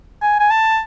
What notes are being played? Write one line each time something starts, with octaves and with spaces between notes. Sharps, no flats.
G#5
G#5
A5